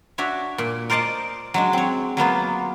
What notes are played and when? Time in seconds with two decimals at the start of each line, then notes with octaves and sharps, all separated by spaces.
0.18 D4 F#4 C#5 E5
0.58 A#2
0.90 A#4 C5 D5 D#5 A5
1.54 F#3 G#3 D4
1.73 C4 C#5
2.17 F#3 A#3 B3 F4